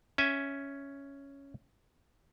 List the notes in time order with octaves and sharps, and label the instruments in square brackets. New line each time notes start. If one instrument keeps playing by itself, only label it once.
[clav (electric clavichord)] C#4 E5 G#5